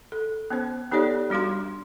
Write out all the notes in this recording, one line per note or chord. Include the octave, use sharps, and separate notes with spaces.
A4
B3 C#4 C5
B3 D#4 G4 A4 C#5 D5
G3 D4 F#4 F5 C6